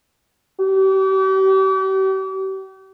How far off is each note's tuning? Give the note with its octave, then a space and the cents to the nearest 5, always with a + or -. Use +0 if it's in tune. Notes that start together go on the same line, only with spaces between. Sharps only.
G4 -40